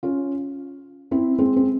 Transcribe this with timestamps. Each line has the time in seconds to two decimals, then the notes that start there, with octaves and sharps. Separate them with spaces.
0.03 C#4 F4
1.11 C4 E4
1.38 G#3 C4
1.56 C4